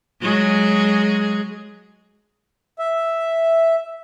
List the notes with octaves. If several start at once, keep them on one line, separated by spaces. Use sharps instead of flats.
F#3 G#3 G#4
E5